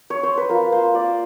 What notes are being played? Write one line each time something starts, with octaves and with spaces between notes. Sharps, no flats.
C#5
C5
B4
F4 A#4
A#3 C5
A#3 D5